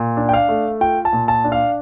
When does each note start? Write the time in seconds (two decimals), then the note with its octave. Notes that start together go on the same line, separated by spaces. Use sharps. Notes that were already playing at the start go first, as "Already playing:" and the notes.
Already playing: A#2
0.17 D4
0.29 G5
0.33 F5
0.49 A3
0.81 F4 G5
1.05 A5
1.13 A#2
1.28 A5
1.44 D4
1.52 F5